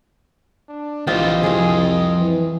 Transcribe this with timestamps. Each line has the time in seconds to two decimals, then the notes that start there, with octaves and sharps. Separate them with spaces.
0.68 D4
1.07 A#1 E3 G3 C4 F4 G4 D#5
1.43 C2 F2 G#4 F5
2.18 E3